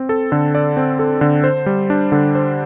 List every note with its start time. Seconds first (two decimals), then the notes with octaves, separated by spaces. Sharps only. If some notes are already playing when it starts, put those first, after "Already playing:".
Already playing: C4
0.09 A4
0.32 D3
0.55 D5
0.77 C4
0.99 A4
1.21 D3
1.44 C5
1.66 G3
1.90 D4
2.12 D3
2.35 C5